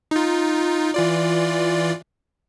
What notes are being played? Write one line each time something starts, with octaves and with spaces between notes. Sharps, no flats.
D#4 F4
E3 F4 D5